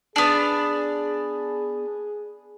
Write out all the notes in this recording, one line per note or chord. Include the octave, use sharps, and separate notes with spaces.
B3 D4 G#4